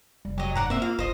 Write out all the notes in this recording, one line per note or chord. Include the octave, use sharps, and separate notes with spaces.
F1 G3
F#3 G4 D#5
G#2 D5 F#5 A#5
A#3 C4 C5 E5
F4 F5
G1 E4 C5 D#5